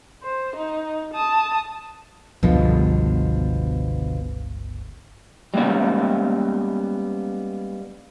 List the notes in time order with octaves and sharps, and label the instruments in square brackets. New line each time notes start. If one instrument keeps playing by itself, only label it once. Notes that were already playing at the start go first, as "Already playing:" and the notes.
[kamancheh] C5
D#4
A5 D#6
[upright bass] G1 C#2 [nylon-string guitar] B2 D3 F3
[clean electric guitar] G3 G#3 A#3 B3 C#4